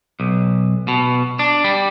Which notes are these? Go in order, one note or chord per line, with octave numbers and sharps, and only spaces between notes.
B1
B2
D4
G3